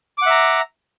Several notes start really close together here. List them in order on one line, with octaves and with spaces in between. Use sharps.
D6 F#5 E5 A#5